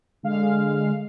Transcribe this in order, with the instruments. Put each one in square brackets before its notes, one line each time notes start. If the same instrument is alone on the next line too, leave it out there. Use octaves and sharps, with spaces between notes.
[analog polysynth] D3 G#3 F5